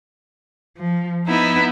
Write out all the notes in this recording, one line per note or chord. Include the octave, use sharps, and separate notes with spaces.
F3
B3 D#4 E4